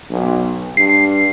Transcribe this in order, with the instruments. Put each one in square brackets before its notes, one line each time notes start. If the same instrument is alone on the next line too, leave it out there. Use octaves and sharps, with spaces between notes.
[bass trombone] B1
[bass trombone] G2 [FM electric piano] C7